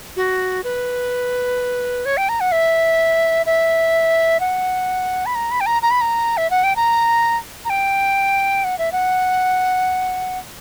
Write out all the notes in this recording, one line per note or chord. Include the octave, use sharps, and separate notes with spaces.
F#4
B4
C#5
G5
A#5
F#5
E5
E5
F#5
B5
A#5
B5
G5
A#5
A#5
B5
A#5
E5
F#5
G5
A#5
A#5
G5
F#5
E5
F#5